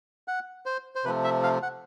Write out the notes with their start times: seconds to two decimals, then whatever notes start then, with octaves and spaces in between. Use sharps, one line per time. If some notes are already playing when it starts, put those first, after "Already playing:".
0.28 F#5
0.66 C5
0.95 C5
1.04 C3 F3 A3 B4
1.24 E5
1.43 F5
1.62 F#5